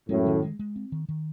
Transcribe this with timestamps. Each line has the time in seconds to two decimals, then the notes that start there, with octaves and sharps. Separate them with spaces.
0.09 F#2 A2 G#3
0.26 D#3
0.42 G#3
0.59 G#3
0.76 C4
0.92 D#3
1.08 D#3